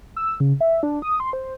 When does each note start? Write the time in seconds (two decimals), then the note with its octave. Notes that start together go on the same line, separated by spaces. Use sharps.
0.16 E6
0.40 C#3
0.61 E5
0.83 D4
1.02 D#6
1.20 C6
1.33 C5